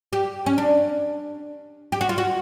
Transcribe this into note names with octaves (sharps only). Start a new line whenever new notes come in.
G4
C#4
D4
G4
F#4
F4
F#4